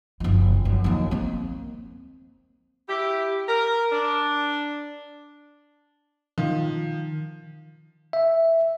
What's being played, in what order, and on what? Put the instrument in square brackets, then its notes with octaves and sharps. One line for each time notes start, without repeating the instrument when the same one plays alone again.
[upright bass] F#1 F3
F#2
D#2 F3
A#3 C4
[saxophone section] E4 G4
A#4
D4
[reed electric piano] D#3 [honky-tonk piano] F3
[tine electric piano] E5